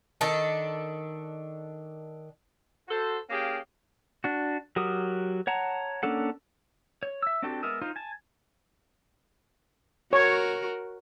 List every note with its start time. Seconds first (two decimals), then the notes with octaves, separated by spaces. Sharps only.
0.21 D#3 D4 A4
2.88 F#4 A4 C5
3.29 A#3 C#4 G4 G#4 F5 G5
4.24 D4 F#4
4.76 F#3 F#4 G4 A#4 D#6
5.47 C#5 F#5 A5 A#5
6.03 A#3 C#4 D4 A4 F#5
7.03 C#5
7.22 E5 E6
7.42 C4 D4 F#4 G4 A4
7.63 G#3 B3 A#4 D#5 E5
7.81 D#4 F4 C5
7.96 G#5 A5
10.13 F#4 A#4 C#5